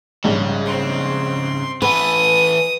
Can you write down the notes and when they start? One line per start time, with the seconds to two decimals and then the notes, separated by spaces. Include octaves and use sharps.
0.24 A#1 G#2 C#3 G3
0.66 C4 C6
1.82 E3 A3 B4 F#5 G#5 D#6